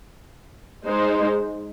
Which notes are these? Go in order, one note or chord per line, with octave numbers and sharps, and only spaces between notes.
G#3 D#4 C5